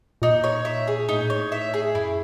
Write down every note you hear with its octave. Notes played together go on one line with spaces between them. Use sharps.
A#2 D#4
C#5
E5
G#4
A2 D#4
A#2
A2 C#5
E5
G#4
F#2 E4